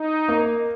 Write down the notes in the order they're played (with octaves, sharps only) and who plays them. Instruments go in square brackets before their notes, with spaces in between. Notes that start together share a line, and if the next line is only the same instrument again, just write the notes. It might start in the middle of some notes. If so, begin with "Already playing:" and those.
Already playing: [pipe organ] D#4
[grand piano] A#3